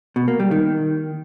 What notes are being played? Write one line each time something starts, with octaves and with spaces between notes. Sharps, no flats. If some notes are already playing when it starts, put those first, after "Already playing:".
B2
A#3
G3
D#3